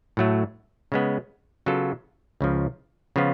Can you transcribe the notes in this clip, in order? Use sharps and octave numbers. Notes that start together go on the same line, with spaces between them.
A2 F#3 A3
C#3 G#3 B3
C#3 F#3 B3 F4 A4
C#2 C#3 F3
C#3 F3 B3 F4